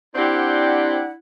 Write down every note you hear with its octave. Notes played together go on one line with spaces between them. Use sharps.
C4 D4 E4 G4 D5 F#5